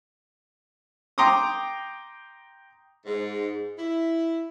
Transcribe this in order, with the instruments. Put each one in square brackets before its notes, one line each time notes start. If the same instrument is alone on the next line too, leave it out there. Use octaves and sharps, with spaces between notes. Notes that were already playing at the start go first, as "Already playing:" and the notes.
[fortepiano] G5 A#5 C6 D6 D#6
[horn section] G#2
E4